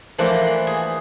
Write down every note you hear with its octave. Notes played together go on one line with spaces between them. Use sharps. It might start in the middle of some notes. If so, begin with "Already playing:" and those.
E3 F3 A3 A#3 D4
B5
G#4